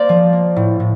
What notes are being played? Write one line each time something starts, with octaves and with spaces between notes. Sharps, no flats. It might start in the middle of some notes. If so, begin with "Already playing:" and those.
Already playing: A#3 C5 D5
F3
A#3
A2
A2